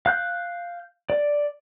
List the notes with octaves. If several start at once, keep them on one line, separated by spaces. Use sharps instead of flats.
F5 F#6 G6
D5